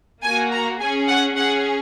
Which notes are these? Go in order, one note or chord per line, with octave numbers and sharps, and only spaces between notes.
A#3 F#4 G#5
A#5
C#4 G#4 G#5
F#5
C#4 G#4 F#5